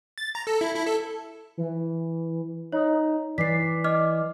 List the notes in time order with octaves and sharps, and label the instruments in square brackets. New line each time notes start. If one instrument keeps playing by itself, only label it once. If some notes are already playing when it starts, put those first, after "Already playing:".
[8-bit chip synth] A6
A#5
A4
E4
E4
A4
[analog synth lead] E3
[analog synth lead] D#4 [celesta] C#5
[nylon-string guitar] E3 [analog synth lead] D5 [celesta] B6 C7
[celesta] D#5 D6 F6